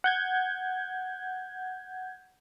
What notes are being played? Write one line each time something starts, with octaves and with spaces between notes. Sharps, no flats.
F#5 G6 G#6